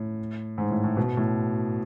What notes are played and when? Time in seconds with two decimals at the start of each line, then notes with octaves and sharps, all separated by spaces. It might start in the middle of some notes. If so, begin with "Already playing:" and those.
Already playing: A2
0.58 G#2
0.71 A2
0.84 A2
0.97 B2
1.17 A2